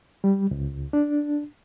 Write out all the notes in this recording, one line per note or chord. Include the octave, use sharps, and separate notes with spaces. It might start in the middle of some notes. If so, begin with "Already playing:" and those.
G3
C#2
D4